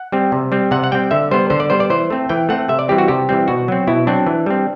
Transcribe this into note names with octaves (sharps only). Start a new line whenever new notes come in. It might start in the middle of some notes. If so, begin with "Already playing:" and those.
Already playing: F#5
G3 C4
C3
G3 C4
C3 F#5
F#5
G3 C4 G5
D3 E5
G3 B3 C5
D3 C5
D5
G3 B3 C5
D5
E3 C5
A3 C4
E3 G5
A3 C4 F#5
C3 E5
D5
E3 G3 C4 G4
F#4
C3 G4
E3 G3 C4
B2 F#4
F#3 C4
B2 E4
F#3 C4 D4
E3
G3 C4